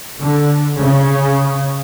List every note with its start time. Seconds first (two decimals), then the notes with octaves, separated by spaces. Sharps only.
0.22 D3
0.80 C#3